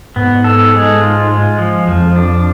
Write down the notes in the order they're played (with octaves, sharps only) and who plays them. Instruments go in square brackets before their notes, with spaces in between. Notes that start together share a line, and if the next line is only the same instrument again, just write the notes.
[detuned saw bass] G#2 [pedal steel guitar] B3
[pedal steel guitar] A4
G#3
F4
G#3
F3
[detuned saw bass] F2 [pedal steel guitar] F3
[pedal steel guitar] D4